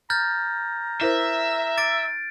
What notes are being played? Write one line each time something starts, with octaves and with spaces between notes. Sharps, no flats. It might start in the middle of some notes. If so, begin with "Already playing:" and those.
A#5 F6 G6 A6
E4 A#4 C5 E5
D6 A6 D7